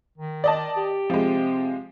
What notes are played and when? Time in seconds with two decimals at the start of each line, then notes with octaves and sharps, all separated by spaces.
0.18 D#3
0.44 D5 D#5 A5
0.77 G4
1.10 C3 F3 G#3